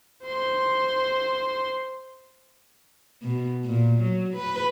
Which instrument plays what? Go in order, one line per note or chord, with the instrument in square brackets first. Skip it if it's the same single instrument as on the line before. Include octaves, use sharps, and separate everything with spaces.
[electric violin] C5 C6
[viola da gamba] B2
A#2
F#3
B4